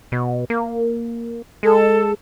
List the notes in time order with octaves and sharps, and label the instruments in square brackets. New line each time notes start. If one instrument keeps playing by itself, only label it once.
[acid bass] B2
A#3
[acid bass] G#3 [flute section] A4